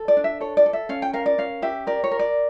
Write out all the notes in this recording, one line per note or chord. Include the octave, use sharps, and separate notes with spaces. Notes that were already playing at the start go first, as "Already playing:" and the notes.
Already playing: A4
D5
D4
E5
A4 C#5
D5
A4
E5
C#4 F5
G5
A#4 F5
D5
C#4 F5
G4 E5
A#4 D5
C#5
A#4
D5